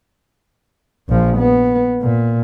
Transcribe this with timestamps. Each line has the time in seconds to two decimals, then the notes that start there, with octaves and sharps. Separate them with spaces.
1.09 A#1 F3
1.38 B3
2.02 A#2